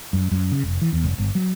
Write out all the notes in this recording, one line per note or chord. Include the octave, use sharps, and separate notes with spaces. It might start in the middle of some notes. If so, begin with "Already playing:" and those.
F#2
F#2
C#3
F1
E3
E2
F1
G1
F#3